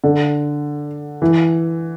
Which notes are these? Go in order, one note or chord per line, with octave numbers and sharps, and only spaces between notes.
D3
E3